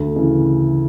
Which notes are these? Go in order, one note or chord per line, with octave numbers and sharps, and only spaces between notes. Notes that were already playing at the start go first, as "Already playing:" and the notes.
Already playing: D2
C#3 E3